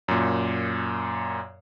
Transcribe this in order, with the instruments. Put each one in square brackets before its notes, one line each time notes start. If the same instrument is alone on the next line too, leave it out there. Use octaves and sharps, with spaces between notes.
[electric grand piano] F#2 A#2